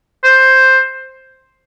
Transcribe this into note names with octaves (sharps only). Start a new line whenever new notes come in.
C5